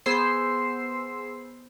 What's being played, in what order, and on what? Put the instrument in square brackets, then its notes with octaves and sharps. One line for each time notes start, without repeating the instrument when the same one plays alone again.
[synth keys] B3 G#4 C5 E6 C7